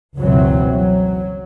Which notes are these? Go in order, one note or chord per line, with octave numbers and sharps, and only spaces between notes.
F#1 C#2 B2 E3 F#3 C4
F#3